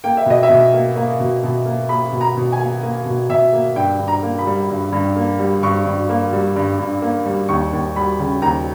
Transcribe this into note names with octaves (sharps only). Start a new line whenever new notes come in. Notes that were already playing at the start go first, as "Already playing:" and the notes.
A#3 G5
E5
B2 D#5
E5
B2
A#3
A#3
B2
B2
A#3
A#3 B5
B2
A#5
B2
G#5
A#3
A#3
B2
B2 E5
A#3
G2 G5
G2
A#5
A#3
B5
G3
G2
G2
A#3
G3
G2 C#6
G2
A#3
G3
G2
G2
A#3
G3
D#2 C#6
D#2
G3 B5
C#3
D#2 A#5